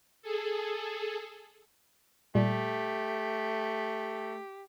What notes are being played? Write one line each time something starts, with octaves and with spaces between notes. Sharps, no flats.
G#4 A4
A#2 G3 A3 G4